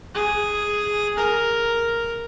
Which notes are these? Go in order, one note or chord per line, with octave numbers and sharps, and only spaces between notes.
G#4
A#4